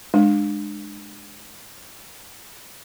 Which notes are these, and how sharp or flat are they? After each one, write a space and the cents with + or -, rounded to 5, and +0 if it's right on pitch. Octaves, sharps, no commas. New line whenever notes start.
G#3 +0 D4 +25